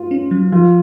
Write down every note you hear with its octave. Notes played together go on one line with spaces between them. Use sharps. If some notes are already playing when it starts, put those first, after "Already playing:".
Already playing: F4
C#4
F#3
F3 F4